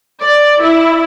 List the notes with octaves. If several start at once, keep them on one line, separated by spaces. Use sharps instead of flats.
D5
E4